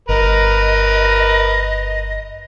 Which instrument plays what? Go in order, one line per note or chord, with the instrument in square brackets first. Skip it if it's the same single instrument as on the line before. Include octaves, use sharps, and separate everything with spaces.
[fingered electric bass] G1 [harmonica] A#4 B4 [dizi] D#5